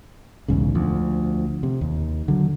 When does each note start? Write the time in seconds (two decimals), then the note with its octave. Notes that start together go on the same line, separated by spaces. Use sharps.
0.48 B1 E2 G#2 C#3
0.75 D2 F3
1.63 C3
1.81 D#2
2.28 D3 F#3